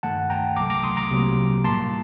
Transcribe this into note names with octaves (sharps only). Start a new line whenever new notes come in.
G2 D#3 A3 F#5 A5
G5 A#5
C2 C3 F#3 A3 A#5 D6
A#5 D6
C6 D#6
A#5 D6
C2 C3 F#3 A#3
A2 G3 A#3 A5 C6